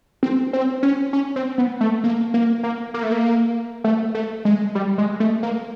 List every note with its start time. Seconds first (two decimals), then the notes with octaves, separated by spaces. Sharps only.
0.23 C4
0.53 C4
0.83 C#4
1.13 C#4
1.36 C4
1.58 B3
1.81 A3
2.04 A#3
2.34 A#3
2.63 A#3
2.94 A#3
3.03 A3
3.12 A#3
3.84 A3
4.15 A3
4.45 G#3
4.75 G3
4.98 G#3
5.20 A3
5.43 A#3